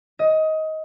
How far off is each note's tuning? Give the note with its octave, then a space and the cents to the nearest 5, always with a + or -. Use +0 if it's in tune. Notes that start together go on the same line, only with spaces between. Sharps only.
D#5 +20